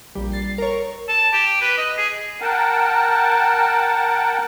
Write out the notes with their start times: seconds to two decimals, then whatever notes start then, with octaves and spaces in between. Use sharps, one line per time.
0.15 A#1 G3
0.32 A6 C7
0.58 A#4 C#5
1.09 A5
1.33 G4
1.61 B4
1.78 D#5
1.97 G#4
2.41 A#4 F#5 G5 A5